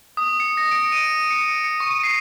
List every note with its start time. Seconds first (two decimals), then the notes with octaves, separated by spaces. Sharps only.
0.17 D#6
0.40 C#7
0.57 A#6
0.71 D7
0.92 D#7
1.31 C#7
1.64 C#7
1.80 C#6
2.03 C7